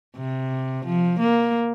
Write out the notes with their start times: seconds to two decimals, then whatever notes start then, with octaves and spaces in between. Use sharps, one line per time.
0.17 C3
0.86 F3
1.19 A#3